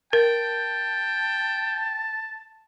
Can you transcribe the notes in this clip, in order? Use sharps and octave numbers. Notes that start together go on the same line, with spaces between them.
A#4 G5 A5